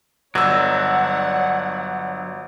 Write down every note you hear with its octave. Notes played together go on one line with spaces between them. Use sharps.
G1 F#3 D4 C#5 F#5 E6